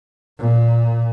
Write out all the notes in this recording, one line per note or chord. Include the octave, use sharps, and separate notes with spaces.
A#2